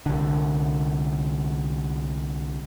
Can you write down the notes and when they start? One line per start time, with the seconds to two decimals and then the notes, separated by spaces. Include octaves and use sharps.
0.06 C2 D3